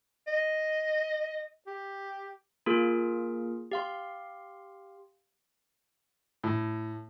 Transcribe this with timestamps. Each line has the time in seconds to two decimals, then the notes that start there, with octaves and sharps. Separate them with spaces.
0.27 D#5
1.67 G4
2.66 A#3 F4 G#4 A#4
3.71 G4 F5 C6
6.44 A2